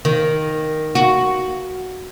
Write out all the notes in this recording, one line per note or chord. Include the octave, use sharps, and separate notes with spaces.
D#3
F#4